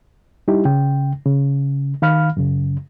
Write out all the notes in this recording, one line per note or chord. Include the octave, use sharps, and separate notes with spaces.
G3 D#4 E4 G4
C#3 G5
C#3
D#3 F5 B5 F6
F#2 C#3